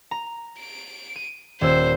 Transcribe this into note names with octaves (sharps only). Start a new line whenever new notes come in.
A#5
D7
D#7
D#1 C5 E6